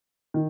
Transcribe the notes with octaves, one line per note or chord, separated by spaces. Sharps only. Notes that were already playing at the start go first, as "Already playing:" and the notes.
D#3